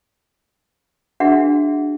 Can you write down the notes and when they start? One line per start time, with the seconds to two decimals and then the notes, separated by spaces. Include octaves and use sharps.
1.20 D4 F#4 G#4 E5 F#5